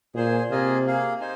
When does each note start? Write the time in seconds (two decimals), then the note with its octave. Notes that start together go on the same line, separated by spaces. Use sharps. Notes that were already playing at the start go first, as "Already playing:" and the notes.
0.15 A#2 G#4 C5 G#5
0.50 C3 A#3 F4 G#4 D#5 G#5
0.85 A#3 G#4 F5
1.20 D#4 C5 G#5